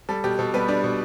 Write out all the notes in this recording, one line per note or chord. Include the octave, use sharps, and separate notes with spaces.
G3 A4
B2 G4
B2 A4
G3 B3 B4
G3 D4 D5
B2